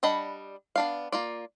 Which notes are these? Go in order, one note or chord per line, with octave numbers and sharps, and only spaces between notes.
G3 D4 D#5 F#5 B5
B3 D4 F5
A#3 F4 D5